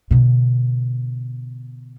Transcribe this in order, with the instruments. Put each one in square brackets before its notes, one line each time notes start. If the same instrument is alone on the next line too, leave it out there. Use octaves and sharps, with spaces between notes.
[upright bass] B2 D3